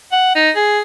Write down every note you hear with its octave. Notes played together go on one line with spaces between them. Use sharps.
F#5
D#4
G#4